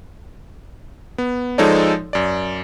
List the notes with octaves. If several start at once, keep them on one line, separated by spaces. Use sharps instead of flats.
B3
F3 G#3 D#4 A4 C#5 D5
F#2 D5